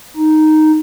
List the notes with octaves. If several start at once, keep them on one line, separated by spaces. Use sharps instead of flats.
D#4